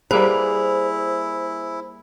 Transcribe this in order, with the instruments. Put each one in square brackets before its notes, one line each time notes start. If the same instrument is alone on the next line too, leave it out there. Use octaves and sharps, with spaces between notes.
[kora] G3 A#3 B4 [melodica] E4 [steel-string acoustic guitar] G#4 [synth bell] C5